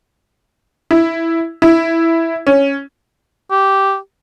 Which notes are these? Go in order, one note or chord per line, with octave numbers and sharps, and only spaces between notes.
E4
E4
C#4
G4